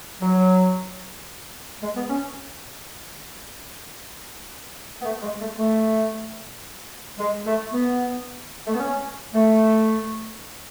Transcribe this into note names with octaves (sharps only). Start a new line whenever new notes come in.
F#3
G#3
B3
C#4
B3
A3
G#3
A3
A3
G#3
A3
B3
A3
B3
C#4
A3